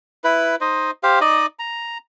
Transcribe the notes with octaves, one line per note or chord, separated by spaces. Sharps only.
E4 B4
D#4 C5 D#5
G4 C5 F5
D#4 D5 D#5
A#5